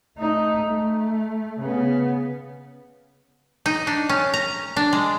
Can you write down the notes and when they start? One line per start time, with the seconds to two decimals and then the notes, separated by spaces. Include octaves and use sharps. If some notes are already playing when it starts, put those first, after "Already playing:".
0.18 A3 D#4
0.65 A3
1.60 C#3 B3
3.66 D#4
3.87 D4
4.09 C#4
4.34 A#5
4.77 D4
4.93 G#3